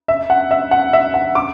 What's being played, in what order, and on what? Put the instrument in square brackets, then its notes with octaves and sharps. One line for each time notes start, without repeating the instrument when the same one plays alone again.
[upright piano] E5
F#5
E5
F#5
E5
F#5
D6